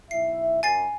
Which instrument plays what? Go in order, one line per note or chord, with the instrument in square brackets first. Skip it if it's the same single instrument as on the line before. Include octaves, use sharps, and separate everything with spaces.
[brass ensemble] B1 E4 E5 [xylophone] C7
[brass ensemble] F#2 [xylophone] G#5 A6 C7